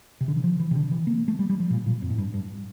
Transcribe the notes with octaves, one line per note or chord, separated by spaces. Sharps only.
C3
D3
E3
F3
E3
C3
D3
E3
A#3
A#3
A3
G3
G3
F3
A#2
A#2
F2
A2
G2
G2